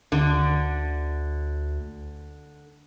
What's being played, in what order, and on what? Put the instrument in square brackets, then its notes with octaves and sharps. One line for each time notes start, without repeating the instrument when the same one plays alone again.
[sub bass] D2 [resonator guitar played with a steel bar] D3